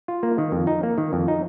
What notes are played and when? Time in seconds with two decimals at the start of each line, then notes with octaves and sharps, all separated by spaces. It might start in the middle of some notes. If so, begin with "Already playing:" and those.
0.08 F4
0.23 A#3
0.38 D#3
0.52 F2
0.67 D#4
0.83 A#3
0.98 D#3
1.13 F2
1.28 D#4